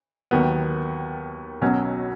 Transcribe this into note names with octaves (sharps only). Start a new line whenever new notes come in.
D#2 D#3 F#3 B3
B1 B2 F#3 C#4 F#4